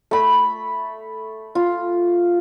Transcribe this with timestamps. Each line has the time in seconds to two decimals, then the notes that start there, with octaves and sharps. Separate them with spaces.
0.11 A3 B5
1.55 F4